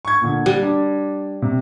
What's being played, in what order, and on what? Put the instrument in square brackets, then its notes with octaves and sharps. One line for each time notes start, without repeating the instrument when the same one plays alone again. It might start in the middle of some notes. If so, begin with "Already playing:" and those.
[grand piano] C#6 G#6
A#2 D3
[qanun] G3
[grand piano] D4
C3